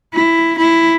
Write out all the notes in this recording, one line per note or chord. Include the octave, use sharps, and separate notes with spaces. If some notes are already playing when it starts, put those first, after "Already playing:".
E4
E4